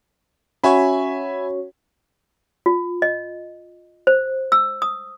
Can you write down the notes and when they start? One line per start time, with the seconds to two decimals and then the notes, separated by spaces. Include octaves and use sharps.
0.64 C#4 F#4 C#5 E5 G#5 B5
2.66 F4
3.02 D#5
4.07 C5
4.52 E6
4.82 D#6